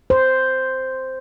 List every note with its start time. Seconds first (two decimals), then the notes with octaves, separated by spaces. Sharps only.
0.10 C5